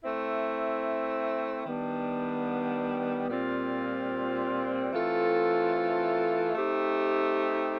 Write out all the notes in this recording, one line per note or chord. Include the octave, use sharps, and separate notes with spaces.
A3 C4 E4
D#3 G3 B3 D4
A#2 G3 C4 F4
E3 A3 C4 F4 A4
A3 C4 D#4 G4